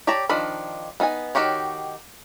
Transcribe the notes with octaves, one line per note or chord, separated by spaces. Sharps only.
G4 C#5 D5 A5 A#5
D#3 F3 D4 B5
B3 D#4 F5 G#5
D#3 F#4 G4 C#5